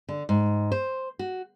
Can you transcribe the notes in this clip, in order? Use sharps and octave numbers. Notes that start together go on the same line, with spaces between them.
D3
G#2
C5
F#4